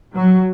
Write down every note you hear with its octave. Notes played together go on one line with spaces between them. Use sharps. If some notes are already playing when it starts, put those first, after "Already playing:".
F#3